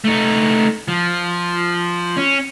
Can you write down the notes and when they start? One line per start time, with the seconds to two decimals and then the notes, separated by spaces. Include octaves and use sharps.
0.04 A3 D#4
0.88 F3
2.17 C#4